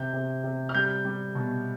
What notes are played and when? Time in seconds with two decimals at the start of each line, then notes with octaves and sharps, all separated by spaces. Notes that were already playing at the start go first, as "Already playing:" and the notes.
Already playing: C3 G6
0.13 C3
0.44 C3
0.69 F6
0.74 G3 G6
1.05 G3
1.35 B2